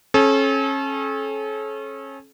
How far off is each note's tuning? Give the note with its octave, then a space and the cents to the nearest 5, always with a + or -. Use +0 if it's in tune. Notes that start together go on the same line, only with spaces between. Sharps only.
C#4 -30 A4 -40